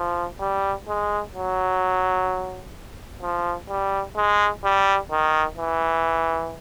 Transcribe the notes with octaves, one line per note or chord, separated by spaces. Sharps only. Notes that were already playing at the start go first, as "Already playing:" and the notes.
Already playing: F3
G3
G#3
F#3
F3
G3
G#3
G3
D#3
E3